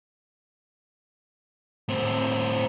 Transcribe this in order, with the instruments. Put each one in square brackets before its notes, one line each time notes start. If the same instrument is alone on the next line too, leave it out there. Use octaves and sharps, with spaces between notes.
[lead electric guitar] A2 C4